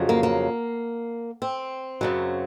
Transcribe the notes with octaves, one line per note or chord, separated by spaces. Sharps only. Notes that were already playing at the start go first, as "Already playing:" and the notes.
Already playing: F2 C#3 F#3
A#3
A#3
C4
F#2 C#3 F#3